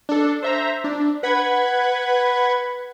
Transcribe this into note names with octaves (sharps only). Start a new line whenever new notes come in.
D4 A4
C5 E5 A#5
D4
B4 F#5 B5 G#6